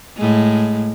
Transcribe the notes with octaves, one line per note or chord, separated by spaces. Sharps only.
A2 G#3